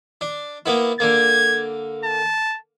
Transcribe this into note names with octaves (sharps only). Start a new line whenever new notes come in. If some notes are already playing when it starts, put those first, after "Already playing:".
D4
A#3 B3 E4
D3 A#3 G#6
A5